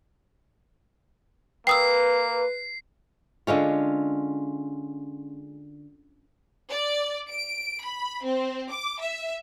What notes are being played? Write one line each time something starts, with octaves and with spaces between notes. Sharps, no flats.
A#3 B4 G5 D#6 E6 C7
D3 G#3 C#4 F4
D5
D7
B5
C4
D6
E5